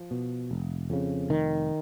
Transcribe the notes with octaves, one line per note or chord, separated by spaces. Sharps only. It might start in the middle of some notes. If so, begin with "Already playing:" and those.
Already playing: F3
B2
F1
F2 C#3
F1 D#3